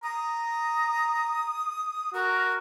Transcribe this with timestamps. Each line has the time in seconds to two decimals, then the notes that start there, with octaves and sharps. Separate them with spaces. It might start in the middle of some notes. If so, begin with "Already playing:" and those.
0.03 A#5 D#6
2.14 F#4 A#4